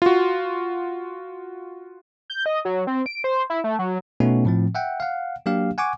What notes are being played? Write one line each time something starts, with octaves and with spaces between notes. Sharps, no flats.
F4 F#4
G6
D#5
F#3
C4
D7
C5
E4
A3
F#3
B2 A3 B3 C#4 D#4 F#4
A2 F3 C4
E5 F#5 G5
F5 F#5
F#3 A#3 D4 G4 F5
F#5 G#5 C#6 D6